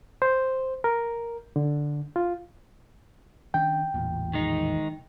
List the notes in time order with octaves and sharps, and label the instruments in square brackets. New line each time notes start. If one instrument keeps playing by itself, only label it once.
[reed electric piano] C5
A#4
D3
F4
[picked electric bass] D#3 C#4 D4 [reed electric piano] G5
[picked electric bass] A1 E2 A#2
[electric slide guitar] D#3 G#3 D#4